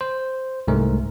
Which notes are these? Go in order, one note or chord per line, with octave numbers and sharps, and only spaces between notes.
C5
C2 G#2 A3 A#4